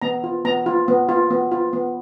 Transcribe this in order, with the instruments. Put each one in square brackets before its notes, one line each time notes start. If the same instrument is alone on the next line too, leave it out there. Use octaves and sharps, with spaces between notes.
[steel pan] B3 A#5
F4
B3 A#5
F4
B3
F4
B3
F4
B3